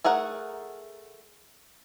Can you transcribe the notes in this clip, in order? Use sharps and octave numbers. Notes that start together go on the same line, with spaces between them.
A3 G#4 A#4 F#5